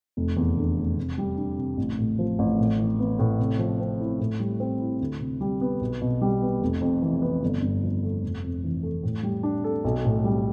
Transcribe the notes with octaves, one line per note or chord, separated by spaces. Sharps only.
F1
E2
D3
A3
C3
G3
D4
C3
A1
A2
F3
A1
A2
E3
B3
A2
C3
F3
C4
E4
A2
G3
C4
E4
D2
C3
G3
B3
B1
B2
G3
B3
F1
F2
E3
B3
G1
G2
F3
A3
F1
F2
E3
A3
A2
G3
D4
A4
B1
A2
G3